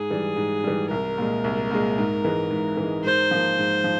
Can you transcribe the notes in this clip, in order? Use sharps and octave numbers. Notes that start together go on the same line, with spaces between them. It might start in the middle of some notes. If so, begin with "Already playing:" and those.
Already playing: G#2 G#4
E3 G3
G#2
E3 G3
C2 A#4
A#2 G#3
C2
A#2 G#3
G#2
E3 G#3
G#2
E3
G#3
G#2 C5
F3 A#3
G#2
F3